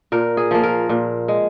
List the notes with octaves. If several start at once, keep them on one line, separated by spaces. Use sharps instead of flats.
A#2 A#4
G#4
F3 A#3
A#4
A#2
G#3